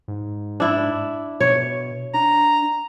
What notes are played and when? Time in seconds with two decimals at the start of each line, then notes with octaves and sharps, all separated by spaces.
0.08 G#2
0.60 D4 E4
1.40 B2 C#5
2.14 D4 A#5